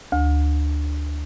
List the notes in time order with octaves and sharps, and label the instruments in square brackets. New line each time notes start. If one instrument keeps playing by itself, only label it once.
[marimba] D2